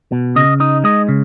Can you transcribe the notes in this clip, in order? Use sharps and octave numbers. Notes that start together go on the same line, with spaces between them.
B2
C#3 D#5
D#4 D#5
G#3 D#5
C#3